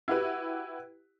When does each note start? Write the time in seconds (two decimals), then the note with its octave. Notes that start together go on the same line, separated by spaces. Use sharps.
0.08 E4 F#4 G4 B4